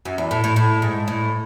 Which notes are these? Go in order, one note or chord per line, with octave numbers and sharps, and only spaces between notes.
F#2
E2
A2
A2
A2
G#2
A2